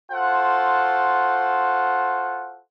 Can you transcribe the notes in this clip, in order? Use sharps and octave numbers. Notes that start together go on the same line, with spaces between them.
F4 F#4 A4 C5 F#5